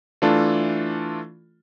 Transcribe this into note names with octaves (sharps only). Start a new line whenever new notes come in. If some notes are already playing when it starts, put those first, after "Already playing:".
E3 A3 D4 F4 A4